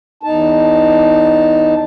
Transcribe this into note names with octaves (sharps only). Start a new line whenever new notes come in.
E2 D#4 A5